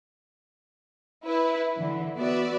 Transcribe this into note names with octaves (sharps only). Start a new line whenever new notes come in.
E4 B4
D3 E3
B3 F#4 B4 D5 E5